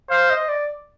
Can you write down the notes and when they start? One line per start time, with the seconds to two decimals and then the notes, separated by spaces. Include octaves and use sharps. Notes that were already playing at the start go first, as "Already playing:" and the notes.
0.10 C5 F5
0.30 D#5
0.49 D5